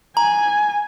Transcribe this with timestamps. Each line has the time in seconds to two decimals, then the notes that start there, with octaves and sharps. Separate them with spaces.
0.17 G#5 A#5